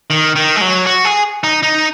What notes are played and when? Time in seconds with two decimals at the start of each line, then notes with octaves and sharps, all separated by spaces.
0.10 D#3
0.36 D#3
0.56 G#3
0.61 F#3
0.86 F#4
1.05 G#4
1.44 D#4
1.63 D#4